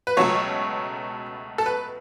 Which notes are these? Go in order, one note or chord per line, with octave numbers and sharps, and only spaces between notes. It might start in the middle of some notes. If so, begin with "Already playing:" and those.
B4
C#2 B2 F#3 A3 C#5
A4
B4